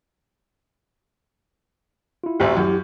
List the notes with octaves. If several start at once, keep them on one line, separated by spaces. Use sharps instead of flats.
E4 F4
A1 D2 G4 C5 E5
F#2 E4 G4